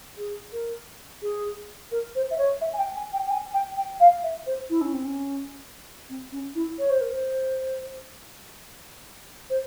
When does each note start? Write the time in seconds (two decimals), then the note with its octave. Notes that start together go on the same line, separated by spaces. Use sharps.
0.17 G#4
0.52 A#4
1.22 G#4
1.91 A#4
2.15 C5
2.30 E5
2.38 C#5
2.61 E5
2.73 G#5
2.78 G5
2.96 G#5
3.13 G5
3.26 G5
3.30 G#5
3.53 G5
3.77 G5
4.00 F5
4.23 E5
4.46 C5
4.69 E4
4.81 C#4
4.93 C4
5.05 C#4
6.09 C4
6.32 C#4
6.55 E4
6.78 C#5
6.90 C5
7.01 A#4
7.12 C5
9.50 C5